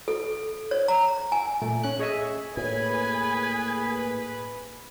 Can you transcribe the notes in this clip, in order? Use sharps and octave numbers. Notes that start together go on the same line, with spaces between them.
A4
C#5
A#5
G#5
A#2 A3
C#4 F#6
G#4 C#5 D#5 E5 G#5
A2 A#3 G#4 B4 G#5